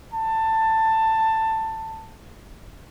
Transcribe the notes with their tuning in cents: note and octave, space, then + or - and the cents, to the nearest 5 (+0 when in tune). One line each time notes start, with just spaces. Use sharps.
A5 +15